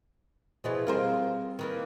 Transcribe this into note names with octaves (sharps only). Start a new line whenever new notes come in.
B2 E3 F3 G#4 C5 D#5
G3 C4 F4 G#4 A#4 C5
D#3 E3 A#3